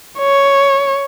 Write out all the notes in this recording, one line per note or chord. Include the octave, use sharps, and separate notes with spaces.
C#5